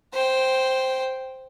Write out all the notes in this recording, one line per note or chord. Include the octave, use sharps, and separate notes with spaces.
C5 G5